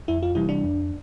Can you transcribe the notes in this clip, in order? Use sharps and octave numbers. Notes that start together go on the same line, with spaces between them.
F2 E4
F4
C3 E3 G3 E4
D4
F2